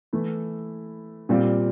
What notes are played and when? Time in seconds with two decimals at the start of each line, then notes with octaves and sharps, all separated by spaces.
0.13 E3 A3 E4
1.29 A#2 G3 C4 F4